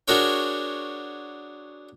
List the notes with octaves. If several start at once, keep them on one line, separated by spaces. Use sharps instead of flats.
D4 F#4 G#4 A#4 C#5 G5